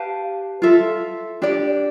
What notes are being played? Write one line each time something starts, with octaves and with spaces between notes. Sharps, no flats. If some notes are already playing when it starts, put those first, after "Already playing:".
Already playing: G4 B4 F5 A5
F4 A4 E5
D4 G4 D5